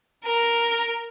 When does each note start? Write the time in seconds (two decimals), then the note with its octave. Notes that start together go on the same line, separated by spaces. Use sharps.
0.25 A#4